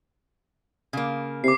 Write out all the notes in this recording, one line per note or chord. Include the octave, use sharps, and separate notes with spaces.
C#3 A#3
C3 D6 C7